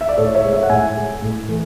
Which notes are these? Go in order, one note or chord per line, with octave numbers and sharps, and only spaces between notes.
E5
D5
A2 A4 C#5
C#5 E5
G#3
C#5 E5
F#5
A2 E5 G#5
G#3
A2
E3 A3